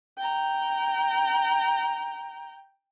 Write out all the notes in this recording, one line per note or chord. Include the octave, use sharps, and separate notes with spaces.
G5 A#5